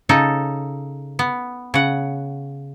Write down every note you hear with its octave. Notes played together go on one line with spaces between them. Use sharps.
C#3 D#4 A4
B3
C#3 F#5